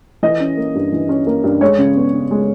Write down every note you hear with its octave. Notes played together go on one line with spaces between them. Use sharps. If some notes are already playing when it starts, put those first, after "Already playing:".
E3 D#5
C#4
A#3
G2
E3
C#4
A#3
G2
G#3 C#5
C#3
B3
C#3
G#3